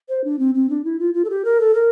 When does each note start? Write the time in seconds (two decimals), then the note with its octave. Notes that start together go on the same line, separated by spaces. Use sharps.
0.09 C5
0.24 D4
0.39 C4
0.55 C4
0.69 D4
0.84 E4
0.99 F4
1.14 F4
1.25 A4
1.30 G4
1.45 A#4
1.60 A4
1.74 A#4